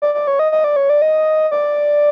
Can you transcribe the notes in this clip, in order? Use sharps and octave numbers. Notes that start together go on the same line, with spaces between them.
D5
D5
C#5
D#5
D#5
D5
C#5
D5
D#5
D5